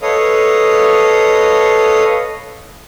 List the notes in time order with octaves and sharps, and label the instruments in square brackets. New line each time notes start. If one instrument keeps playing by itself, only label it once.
[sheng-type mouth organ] A4 B4 C#5 D#5 F5 D#6